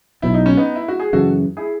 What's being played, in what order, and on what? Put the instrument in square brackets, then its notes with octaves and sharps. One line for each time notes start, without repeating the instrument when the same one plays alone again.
[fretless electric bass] B1 B2 F#3 B3 [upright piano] E4
[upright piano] D#4
C#4
B3 D#4
E4
F#4
G#4
[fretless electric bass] F#2 C#3 E3 [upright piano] F#4 A4
[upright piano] E4 G#4